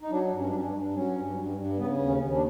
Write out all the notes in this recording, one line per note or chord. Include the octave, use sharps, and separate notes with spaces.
D#4
F#3 D4
G2
C#4
D4
G2 C#4
D4
G2
F#3 C#4
G2
G2
G2
C#3 B3
D#2
C#4
D#2
D4